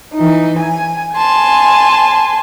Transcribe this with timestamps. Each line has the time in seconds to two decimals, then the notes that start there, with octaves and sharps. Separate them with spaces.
0.14 E3 D#4
0.58 G#5
1.14 G#5 A5 C6